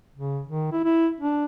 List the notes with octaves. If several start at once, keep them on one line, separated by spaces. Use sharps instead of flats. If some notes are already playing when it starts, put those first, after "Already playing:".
C#3
D#3
E4
E4
D4